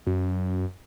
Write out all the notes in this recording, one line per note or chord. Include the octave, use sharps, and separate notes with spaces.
F#2